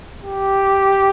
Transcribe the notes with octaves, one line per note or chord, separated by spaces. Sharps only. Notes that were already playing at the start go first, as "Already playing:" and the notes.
G4